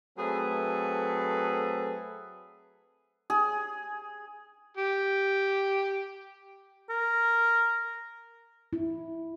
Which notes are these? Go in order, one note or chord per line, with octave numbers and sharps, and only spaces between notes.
F#3 A3 C4 G#4 A4 B4
G#4
G4
A#4
E4